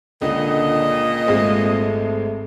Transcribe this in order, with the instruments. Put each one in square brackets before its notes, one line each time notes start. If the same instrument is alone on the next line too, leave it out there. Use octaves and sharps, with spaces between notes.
[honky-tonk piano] C#2 [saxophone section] A#2 D#5 [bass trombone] D3
[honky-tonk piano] G#1 G#3 C4 [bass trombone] A3